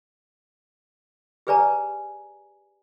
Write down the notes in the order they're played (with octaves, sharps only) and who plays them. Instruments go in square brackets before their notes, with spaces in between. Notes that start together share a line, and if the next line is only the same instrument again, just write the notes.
[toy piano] G4 G#4 B4 D5 G#5 A#5